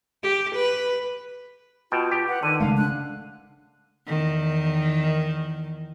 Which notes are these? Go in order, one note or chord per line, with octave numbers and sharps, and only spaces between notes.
G4
B4
B2 F4 G5 A5
G4
B4 F#5
D3 D#3 D#7
C#3 G#3 A3 F5
D4 F#6
E2 D#3